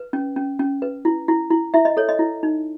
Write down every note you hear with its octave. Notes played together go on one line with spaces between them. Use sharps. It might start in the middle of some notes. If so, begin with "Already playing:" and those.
Already playing: B4
C#4
C#4
C#4
B4
E4
E4
E4
E4 E5
D#5
A4 C#5
D#5
E4
D#4